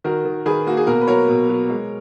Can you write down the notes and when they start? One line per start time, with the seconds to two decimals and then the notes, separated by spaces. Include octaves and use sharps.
0.04 D#3 F#4 A#4
0.25 D#3
0.46 D#3 G#4 B4
0.67 A#3 F#4
0.77 G#4
0.87 B2 F#4 A#4
1.01 B4
1.07 F#3 A#4 C#5
1.28 B2
1.49 F#3
1.69 G#3